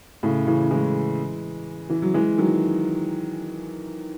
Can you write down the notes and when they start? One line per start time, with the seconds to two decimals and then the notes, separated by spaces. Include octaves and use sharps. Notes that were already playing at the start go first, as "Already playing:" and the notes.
0.23 A2 C#3
0.47 C#3 E3
0.71 E3 G#3
1.90 E3
2.02 F#3
2.14 E3 G#3
2.38 D#3 F#3